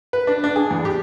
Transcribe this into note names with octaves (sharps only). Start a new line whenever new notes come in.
B4
D4
D4
G#4
E2
G4